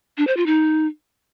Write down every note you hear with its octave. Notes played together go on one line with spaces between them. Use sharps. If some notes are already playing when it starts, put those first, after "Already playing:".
D4
C5
F4
D#4